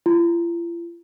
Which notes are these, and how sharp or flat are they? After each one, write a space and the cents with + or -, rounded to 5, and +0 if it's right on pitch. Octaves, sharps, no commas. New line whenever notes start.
F4 -45